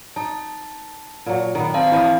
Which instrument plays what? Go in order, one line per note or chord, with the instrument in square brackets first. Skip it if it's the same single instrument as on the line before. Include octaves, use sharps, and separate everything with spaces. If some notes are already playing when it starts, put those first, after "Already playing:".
[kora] D#4 [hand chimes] A5
[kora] A#2 F#3
D#3 B3
[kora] C4 [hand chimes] D5 F5 A5
[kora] E3 D#5 [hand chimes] E4 D5